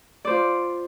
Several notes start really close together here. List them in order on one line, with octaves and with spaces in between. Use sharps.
D5 C5 F4